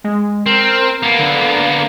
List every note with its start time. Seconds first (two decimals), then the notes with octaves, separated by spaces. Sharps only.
0.04 G#3
0.46 C4 A#4
1.03 A#3 B3
1.19 D3